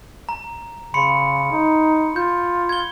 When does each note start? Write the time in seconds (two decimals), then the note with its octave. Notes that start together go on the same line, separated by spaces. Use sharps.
0.29 A#5
0.94 C#3 B5 C6 C#7
1.52 D#4
2.16 F4 G6
2.69 G#6 G7